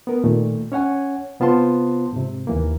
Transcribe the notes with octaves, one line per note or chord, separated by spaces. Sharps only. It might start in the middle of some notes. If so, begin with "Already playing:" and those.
B3 A#4
A#2 D#3 A3
C#4 C#5 F#5 G#5
C3 B3 F4 C5 A5 C6
G#2 C3
D#2 E3 A#3